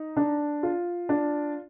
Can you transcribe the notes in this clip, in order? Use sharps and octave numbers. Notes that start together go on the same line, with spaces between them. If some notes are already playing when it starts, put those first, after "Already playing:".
Already playing: D#4
D4
F4
D4